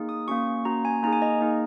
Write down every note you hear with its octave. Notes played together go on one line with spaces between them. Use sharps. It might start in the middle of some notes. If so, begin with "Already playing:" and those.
Already playing: A#3 D#4 G#4
D#6
A#3 C#4 F#4 C#6
A#3 C#4 F#4 A#5
G#5
A#3 D#4 G#4 A#5
G#5
D#5
A#3 D#4 G#4